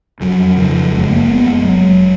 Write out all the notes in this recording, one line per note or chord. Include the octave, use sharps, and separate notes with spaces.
F2 F#3
C#3 F3
F#1 G#3
A#3
F#1 B3
G#3
F1 F#3